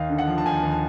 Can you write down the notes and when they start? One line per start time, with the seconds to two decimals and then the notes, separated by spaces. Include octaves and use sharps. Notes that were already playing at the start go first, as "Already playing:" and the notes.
Already playing: D#2 F5
0.09 D3
0.18 F#5
0.27 F3
0.38 A5
0.45 D#2 G#5
0.63 D#2
0.72 A5